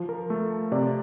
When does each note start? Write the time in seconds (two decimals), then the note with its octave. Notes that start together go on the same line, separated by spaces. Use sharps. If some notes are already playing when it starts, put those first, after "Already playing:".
Already playing: F3
0.09 A#4
0.30 A3 A4
0.72 C3 D5